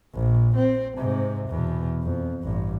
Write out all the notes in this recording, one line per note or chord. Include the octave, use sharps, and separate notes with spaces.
A#1
C4
G#2 C3
E2 B2
F2
A1 G2